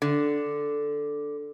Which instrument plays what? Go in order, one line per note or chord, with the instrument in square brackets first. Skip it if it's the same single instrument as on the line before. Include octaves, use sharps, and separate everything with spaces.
[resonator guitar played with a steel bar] D3